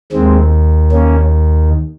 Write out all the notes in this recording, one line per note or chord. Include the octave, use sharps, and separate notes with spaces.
D#2 D#3 G#3 C4
A#3 C#4